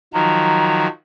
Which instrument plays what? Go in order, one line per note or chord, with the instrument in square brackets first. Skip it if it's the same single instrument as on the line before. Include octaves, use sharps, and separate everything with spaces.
[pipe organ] D#3 F3 F#3 [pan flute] A#5